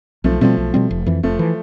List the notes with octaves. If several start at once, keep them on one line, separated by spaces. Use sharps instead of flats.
B1 F3 A3
B2 F3 G3 A3 C4
B1
B2 G3 C4
F1
F2 E3
F1 F3 A3
E3